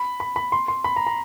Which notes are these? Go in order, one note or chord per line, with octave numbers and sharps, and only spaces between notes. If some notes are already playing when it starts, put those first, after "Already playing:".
Already playing: B5
B5
B5
C6
C6
B5
A#5
A#5